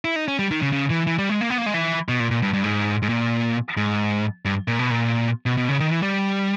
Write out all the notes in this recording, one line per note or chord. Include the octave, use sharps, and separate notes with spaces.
E4
D#4
C#4
G3
D#3
C#3
C#3
E3
E3
G3
G#3
A#3
B3
A#3
G#3
E3
B2
A#2
A#2
G2
G2
G#2
G#2
A#2
G#2
G2
A#2
B2
A#2
B2
B2
C#3
D#3
E3
G3